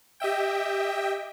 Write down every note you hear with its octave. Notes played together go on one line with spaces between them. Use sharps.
G4 D#5 E5 G5